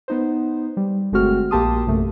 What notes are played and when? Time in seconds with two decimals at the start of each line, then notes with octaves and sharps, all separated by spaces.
0.08 B3 D#4 C5
0.77 G3
1.12 G1 G#3 A3 C4 F#4 F6
1.51 A#1 A#3 G4 A5 C6 D#6
1.86 A#1 F#2 C3 A3